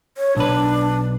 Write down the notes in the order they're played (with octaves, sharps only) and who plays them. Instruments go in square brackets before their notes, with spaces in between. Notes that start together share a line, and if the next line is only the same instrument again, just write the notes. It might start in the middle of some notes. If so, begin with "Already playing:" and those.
[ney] C#5
[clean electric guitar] B1 B4 [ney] D4